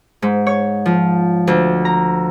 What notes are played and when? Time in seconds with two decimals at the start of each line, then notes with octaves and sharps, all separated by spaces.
0.22 G#2
0.46 C#5
0.86 F3
1.47 D2
1.85 A#5